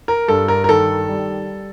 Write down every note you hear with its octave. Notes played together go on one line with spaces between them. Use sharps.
A#4
G2 A4
A#4
A#4
D#3 A4
G3